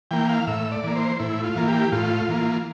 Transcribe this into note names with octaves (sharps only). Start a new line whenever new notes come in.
E3 A#3 G5
F5
A2 E5
D5
E3 A#3
C5
A2 E4
F4
E3 A#3
G4
A2 F4
E3 A#3